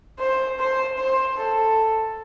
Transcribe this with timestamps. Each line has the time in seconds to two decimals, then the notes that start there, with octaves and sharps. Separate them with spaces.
0.19 C5
0.59 C5
0.98 C5
1.37 A4